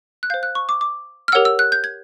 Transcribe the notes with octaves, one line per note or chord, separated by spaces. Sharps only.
F#6
C5 F5 G6
F#6
C#6
D6
D6
F6
G4 A#4 C#5 F#5 E6
E6
F#6
G6
G#6